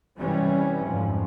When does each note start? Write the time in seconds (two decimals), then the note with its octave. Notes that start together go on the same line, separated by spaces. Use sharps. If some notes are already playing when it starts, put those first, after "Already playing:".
0.18 C3 E3 G3 C#4
0.86 F2 G#2 F3